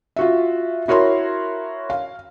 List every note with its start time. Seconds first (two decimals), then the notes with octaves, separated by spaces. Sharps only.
0.16 F4 F#4 E5
0.88 E4 F#4 A#4 C#5 C6
1.90 F5